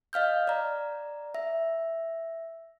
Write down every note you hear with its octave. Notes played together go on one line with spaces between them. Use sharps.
D#5 F5 F6 G6
D5 A#5
E5